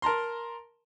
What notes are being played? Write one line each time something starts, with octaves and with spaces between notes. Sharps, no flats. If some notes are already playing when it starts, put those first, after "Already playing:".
A#4 A5 A#5 C6